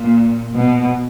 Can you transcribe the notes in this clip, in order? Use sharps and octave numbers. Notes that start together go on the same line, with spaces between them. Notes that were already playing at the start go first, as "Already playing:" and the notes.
Already playing: A#2
B2